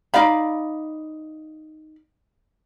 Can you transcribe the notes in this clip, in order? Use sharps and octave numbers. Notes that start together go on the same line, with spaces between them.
D#4 D5 F5 B5